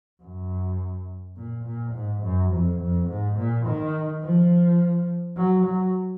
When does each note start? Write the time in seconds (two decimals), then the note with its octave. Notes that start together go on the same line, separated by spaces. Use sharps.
0.23 F#2
1.37 A#2
1.65 A#2
1.94 G#2
2.23 F#2
2.52 F2
2.80 F2
3.08 G#2
3.37 A#2
3.66 D#3
4.22 F3
5.37 F#3
5.65 F#3